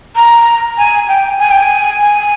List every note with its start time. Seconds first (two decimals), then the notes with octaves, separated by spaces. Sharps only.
0.16 A#5
0.78 G#5
1.08 G5
1.39 G#5
1.51 G5
1.62 G#5
2.01 G#5